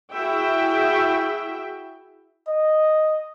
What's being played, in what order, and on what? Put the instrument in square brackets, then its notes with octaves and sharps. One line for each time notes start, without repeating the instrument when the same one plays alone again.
[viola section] E4 F#4 G#4 E5 G5
[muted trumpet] D#5